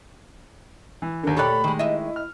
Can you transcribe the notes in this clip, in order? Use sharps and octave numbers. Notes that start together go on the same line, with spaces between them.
E3
D#2 D3 A#4
D2 A#2 G4 A4 C#5 D5 B5 F#6
D#3 G#3
E4 D#5 E5
F6